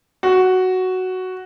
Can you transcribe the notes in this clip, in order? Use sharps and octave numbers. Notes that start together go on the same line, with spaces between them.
F#4